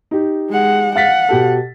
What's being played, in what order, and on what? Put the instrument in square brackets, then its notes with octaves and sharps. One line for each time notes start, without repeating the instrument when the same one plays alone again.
[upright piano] D#4 G4
[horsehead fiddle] G#3 F#5
[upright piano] F5 A6 B6 [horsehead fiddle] F#5
[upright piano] B2 G4 A4